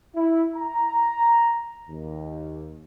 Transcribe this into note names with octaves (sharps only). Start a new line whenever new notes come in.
E4
A#5
D#2